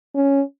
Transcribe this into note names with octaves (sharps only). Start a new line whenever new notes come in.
C#4